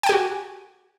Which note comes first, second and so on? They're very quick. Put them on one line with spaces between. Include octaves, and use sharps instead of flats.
G5 G#5 G4 F#4